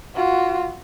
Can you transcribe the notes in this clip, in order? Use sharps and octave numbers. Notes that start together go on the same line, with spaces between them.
F4 F#4